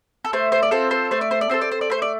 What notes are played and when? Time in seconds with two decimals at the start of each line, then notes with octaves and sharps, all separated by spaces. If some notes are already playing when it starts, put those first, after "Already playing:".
0.25 A4
0.33 A3 C5
0.52 C5
0.63 D5
0.71 C4 F4 A4 C5
0.91 C5
1.11 A3 C5
1.21 D5
1.31 C5
1.41 D5
1.50 C4 F4 A4 C5
1.61 D5
1.71 C5
1.81 D5
1.90 A3 C5
2.02 D5